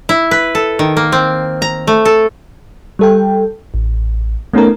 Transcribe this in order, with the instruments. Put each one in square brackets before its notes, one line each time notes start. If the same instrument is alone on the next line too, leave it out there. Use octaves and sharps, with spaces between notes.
[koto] E4
B4
A4
D#3
A#3
C4
A#5
A3
A4
[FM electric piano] G3 A4 G5
A1
A3 B3 C#4 D#4 A4 A#4